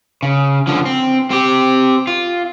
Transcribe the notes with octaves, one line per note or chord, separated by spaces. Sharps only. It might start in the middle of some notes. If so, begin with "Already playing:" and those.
C#3
D3 F3
C4
C4 G4
F4